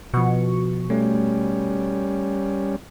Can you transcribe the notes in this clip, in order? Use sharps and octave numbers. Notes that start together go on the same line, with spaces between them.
B2 F3 C#6
G3 A3 C#4